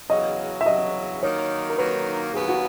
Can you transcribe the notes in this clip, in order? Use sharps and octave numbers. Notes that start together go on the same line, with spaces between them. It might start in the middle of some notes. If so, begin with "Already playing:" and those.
E2 C#3 F#3 D#5
E5
E2 C#3 F#3 D#5
D#3 F#3 A#3 D#4 C#5
A#4
D#3 F#3 A#3 D#4 B4
D#2 C#3 F#3 B3 G#4
F#4